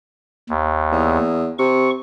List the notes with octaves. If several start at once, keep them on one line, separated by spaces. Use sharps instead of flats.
D#2
E2
C3 C#6